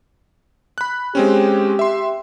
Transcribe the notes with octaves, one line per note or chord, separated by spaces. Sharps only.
B5 F#6
G#3 C4 C#4 G4
E5 C6